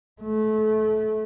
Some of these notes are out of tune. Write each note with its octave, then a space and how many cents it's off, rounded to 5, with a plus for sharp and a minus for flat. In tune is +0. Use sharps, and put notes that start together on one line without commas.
A3 -25